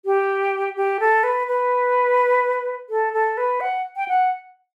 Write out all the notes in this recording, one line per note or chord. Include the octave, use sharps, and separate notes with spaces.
G4
G4
A4
B4
B4
A4
A4
B4
F#5
G5
F#5